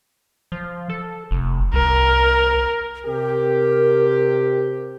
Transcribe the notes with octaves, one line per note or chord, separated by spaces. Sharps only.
F3
A4
F1
C2 A#4
C3 G4 A#4